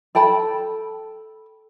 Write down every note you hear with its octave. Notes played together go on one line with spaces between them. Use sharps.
A4 G5 A5 B5